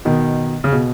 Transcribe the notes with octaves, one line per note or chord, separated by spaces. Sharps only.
B2 D#3
C#3
B2